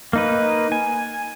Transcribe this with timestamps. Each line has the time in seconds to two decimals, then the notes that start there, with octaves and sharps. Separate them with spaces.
0.13 A#3 D#4 B4
0.72 G#5